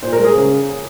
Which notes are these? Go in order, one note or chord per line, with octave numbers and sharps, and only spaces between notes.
A#2 C5
A#4
G#3
G#4
C#3